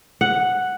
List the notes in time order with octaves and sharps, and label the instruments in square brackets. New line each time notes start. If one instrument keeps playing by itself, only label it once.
[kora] F#5